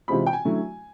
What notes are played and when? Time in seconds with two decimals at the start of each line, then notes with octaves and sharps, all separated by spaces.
0.08 C3 E3 G#3 C4 F4 B5
0.26 G5
0.33 G#5
0.45 D3 F#3 A3 C#4 E4